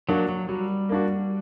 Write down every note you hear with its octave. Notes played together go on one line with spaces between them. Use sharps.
F#3 A#3 D4 F#4
F#3
F#3 G3
A#3 D4 F#4